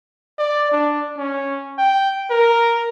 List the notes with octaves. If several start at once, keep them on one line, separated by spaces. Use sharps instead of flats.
D5
D4
C#4
G5
A#4